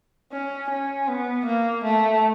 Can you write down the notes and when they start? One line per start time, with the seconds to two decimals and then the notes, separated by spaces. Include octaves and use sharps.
0.32 C#4
0.70 C#4
1.08 B3
1.46 A#3
1.84 A3